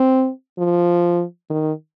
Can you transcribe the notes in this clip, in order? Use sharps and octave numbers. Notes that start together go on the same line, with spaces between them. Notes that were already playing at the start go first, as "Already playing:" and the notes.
Already playing: C4
F3
D#3